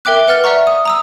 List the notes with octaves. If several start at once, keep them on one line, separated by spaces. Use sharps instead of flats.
A#4 E5 G5 D6 F#6
B4 F#5 F6 A6 G7
D5 E5 F#5 A#5 C#6
D#6
A#5 D#6 E6